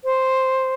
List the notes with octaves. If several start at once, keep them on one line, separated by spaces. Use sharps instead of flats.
C5